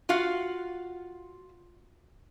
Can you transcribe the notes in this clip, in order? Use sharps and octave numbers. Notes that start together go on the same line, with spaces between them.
F4 F#4 F5